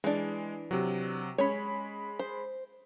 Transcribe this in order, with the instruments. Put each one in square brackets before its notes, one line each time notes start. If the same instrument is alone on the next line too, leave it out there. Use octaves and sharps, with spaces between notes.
[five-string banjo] E3 D4 [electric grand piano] G#3
[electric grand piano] C3 F#3
[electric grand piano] G#3 B5 [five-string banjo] C#4 C#5
[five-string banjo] C5